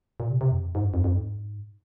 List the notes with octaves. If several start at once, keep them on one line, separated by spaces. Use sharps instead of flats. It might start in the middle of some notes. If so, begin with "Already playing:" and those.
A#2
C3
C3
F2
G#2
G2
F2
F2
G#2